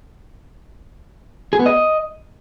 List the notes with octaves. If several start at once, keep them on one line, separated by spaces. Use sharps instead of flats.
G#4
B3
D#5